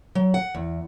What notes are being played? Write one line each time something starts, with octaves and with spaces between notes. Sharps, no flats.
F#3
F#5
E2